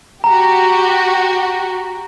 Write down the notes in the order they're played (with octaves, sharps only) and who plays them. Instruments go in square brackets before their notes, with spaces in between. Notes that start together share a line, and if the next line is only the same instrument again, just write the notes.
[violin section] F#4 G4 [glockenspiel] A#5